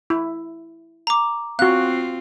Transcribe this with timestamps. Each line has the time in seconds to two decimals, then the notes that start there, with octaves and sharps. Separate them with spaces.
0.10 E4
1.07 A#5 D6
1.59 C4 F4 F#4 F5 F#6